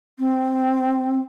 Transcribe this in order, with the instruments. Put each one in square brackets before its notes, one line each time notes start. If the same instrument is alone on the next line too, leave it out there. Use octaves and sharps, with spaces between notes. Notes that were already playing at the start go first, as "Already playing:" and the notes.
[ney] C4